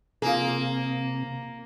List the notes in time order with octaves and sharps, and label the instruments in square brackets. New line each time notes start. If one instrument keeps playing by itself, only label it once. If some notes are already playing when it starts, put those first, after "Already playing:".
[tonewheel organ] C3 [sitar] A#3 [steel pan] F4 G#4